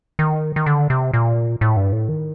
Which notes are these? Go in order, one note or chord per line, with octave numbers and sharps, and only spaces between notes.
D#3
D#3
D3
C3
A#2
A2
G2
A2
D#3